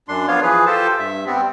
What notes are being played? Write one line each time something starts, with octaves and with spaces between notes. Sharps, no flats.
F#2 D4 C6
F3 B3 D4 F4 C#5 F5
E3 F3 G#4 B4
F4 G4 A4 C5 A5
G2 E5
G3 B3 C4